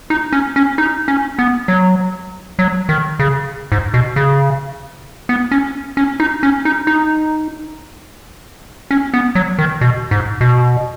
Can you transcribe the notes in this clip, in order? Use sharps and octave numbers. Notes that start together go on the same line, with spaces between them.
D#4
C#4
C#4
D#4
C#4
B3
F#3
F#3
D#3
C#3
G#2
B2
C#3
B3
C#4
C#4
D#4
C#4
D#4
D#4
C#4
B3
F#3
D#3
B2
G#2
B2